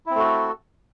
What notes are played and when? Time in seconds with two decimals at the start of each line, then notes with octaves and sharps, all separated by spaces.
0.06 E4
0.11 C4
0.15 A3
0.19 F#4
0.24 A4